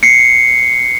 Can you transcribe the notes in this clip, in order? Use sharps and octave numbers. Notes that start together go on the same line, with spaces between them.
C7 C#7